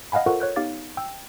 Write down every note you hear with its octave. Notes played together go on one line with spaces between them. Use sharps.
D#5 F5 F#5 G#5 B5
F4 A4 A#4 C5 F#5 C#6
C#5 F#6 G6
B3 D#4 G4 F5 D6 A6
G5 E6